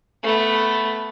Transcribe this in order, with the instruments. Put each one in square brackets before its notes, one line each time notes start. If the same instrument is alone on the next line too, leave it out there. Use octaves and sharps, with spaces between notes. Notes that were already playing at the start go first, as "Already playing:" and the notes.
[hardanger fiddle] A3 B3